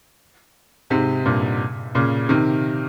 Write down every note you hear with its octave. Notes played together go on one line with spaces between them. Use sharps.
G#2 C3
G2 A#2
A#2 C#3
C3 D#3